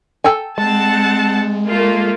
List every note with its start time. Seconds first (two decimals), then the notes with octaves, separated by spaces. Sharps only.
0.24 A4 G5 G#5
0.58 G#3 C4 F#5 A5
1.69 A3 A#3 F4